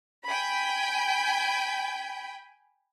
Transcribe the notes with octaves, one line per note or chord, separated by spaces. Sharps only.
G5 G#5 B5